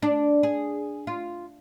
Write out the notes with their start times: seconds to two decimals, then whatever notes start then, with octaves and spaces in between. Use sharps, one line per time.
0.02 D4
0.43 G#4
1.07 F4